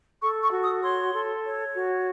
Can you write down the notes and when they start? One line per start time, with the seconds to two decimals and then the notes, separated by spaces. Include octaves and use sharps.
0.22 A4 C#6
0.43 C#6
0.53 F#4
0.63 D#6
0.83 C#5 C6
1.14 A4
1.44 C#5
1.73 F#4